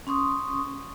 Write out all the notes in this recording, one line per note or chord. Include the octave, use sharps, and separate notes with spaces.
C#4 C6 C#6 D#6